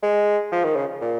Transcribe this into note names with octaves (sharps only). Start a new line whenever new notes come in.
G#3
F3
D#3
C#3
A#2